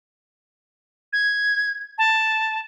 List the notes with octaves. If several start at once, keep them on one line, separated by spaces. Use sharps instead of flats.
G#6
A5